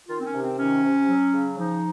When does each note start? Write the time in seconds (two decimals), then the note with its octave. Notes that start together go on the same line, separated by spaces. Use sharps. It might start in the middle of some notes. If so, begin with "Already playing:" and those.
0.08 D#3 F4
0.20 C4
0.25 C#4
0.33 C3
0.42 C4
0.58 D#3 C#4
0.83 C3
1.08 F#3
1.34 C#3
1.58 F3 D#4